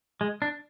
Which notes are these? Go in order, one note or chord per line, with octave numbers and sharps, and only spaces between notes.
G#3
D4